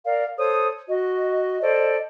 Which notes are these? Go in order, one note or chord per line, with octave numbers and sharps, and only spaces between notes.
A#4 D5 F5
A4 C5 C#5 D#6
F#4 D#5
A4 C5 D5 D#5